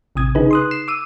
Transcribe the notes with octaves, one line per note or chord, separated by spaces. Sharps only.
A1 C3 D#6 G#6
C#3 D#4 G#4 B4
C6 D#6 F#6
C7 E7
D6 E6 D#7